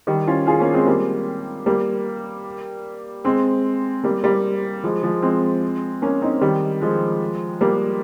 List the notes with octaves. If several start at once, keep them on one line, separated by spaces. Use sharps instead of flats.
D#3 G3
C#4 F4
F4 G#4
A#3 C#4
G#3 C4
G3 A#3
G3 A#3
G#3 C4
G3 A#3
G3 A#3
F3 G#3
F3 G#3
G#3 C4
A#3 C#4
C4 D#4
D#3 G3
F3 G#3
G3 A#3